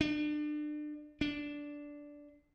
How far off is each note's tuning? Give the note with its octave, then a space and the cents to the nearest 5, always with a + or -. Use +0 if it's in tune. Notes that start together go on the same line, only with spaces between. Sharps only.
D4 +35
D4 -10